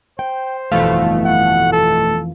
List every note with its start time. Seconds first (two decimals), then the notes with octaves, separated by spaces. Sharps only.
0.19 C5 G5
0.72 G1 F2 B2 E3 A3 F5
1.25 F#5
1.73 A4